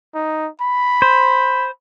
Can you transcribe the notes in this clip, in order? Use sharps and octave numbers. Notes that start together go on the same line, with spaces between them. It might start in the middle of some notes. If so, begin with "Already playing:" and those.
D#4
B5
C5